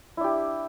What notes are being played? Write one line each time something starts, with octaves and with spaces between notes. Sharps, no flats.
D4 E4 G4